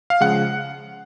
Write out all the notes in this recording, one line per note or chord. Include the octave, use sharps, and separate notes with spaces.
F5
C#3 F3 G#3 F#5